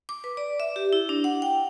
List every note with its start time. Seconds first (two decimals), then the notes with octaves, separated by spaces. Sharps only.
0.09 D6
0.24 B4
0.37 D5
0.60 E5
0.76 G4
0.93 E4
1.09 D4
1.24 F#5
1.42 G5